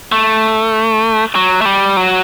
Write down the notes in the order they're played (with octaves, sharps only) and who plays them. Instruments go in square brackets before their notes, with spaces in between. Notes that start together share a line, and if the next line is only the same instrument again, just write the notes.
[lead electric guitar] A3
F#3
A3
G3
F#3